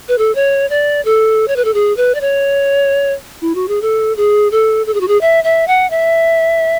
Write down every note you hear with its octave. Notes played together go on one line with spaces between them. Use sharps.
B4
A4
C#5
D5
A4
C#5
B4
A4
G#4
B4
D5
C#5
E4
F#4
G#4
A4
G#4
A4
A4
G#4
F#4
G#4
E5
E5
F#5
E5